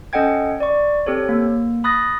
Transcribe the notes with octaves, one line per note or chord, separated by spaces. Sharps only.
C#4 A4 D#5 F#5 G5 G#6
D5 C#6
C4 G4 A4 C#5
A#3
B5 D#6 F#6 A6 A#6